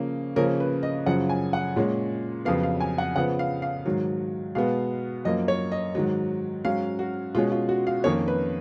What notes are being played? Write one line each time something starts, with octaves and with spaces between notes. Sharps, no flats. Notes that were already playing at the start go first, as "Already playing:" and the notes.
Already playing: C#3 F3 A#3 C#4
C#3 F3 A#3 C#4 A#4
B4
D#5
F#2 C#3 F3 F#5
G#5
F#5
A#2 G#3 C#4
F2 C#3 F#3 B3 F5
F5
G#5
F#5
C#3 F3 B3 F#5
F5
F5
G#2 D#3 F#3
B2 G#3 B3 F5
F#2 F3 A#3 D#5
C#5
D#5
G#2 D#3 F#3
G#2 F#3 C#4 F5
F#4
B2 G#3 C#4 F4
F4
F#4
F5
F2 D#3 A#3 C#4 C#5
B4